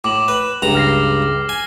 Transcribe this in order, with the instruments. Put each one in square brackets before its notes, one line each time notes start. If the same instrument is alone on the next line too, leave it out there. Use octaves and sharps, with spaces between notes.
[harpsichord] A2 [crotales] D6 F#7
[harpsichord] B4
C#2 G2 A#5
[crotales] F6 A#6 C7
[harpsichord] G#5